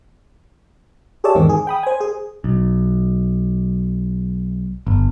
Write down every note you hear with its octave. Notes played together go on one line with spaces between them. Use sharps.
G4 G#4 C#5 D5 E5 A5
E2 G#2 D#3 C4
G#4
G5 B5 D#6
C5 G#5
G#4
B1
G1